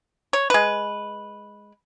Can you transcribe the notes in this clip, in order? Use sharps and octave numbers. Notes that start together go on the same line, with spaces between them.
C#5
G#3 B4